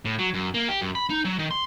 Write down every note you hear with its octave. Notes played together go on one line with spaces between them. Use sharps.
A2
F#3
F#2
A#3
G4
F#2
B5
D#4
F#3
D#3
C6